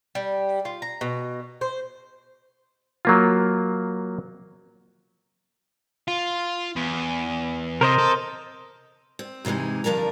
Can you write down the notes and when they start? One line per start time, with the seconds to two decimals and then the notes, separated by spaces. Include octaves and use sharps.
0.15 G3
0.65 F4
0.82 A#5
1.01 B2
1.61 C5
3.05 F#3 A#3 F4
6.08 F4
6.76 E2
7.81 C3 A#4 C5 D#5
7.99 A4
9.19 C4
9.45 G#2 C3 E3 G#3 D#4
9.84 G2 D3 F3 A#4 A#5